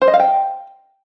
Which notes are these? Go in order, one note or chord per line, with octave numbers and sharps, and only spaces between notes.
C5
D#5
F5
G5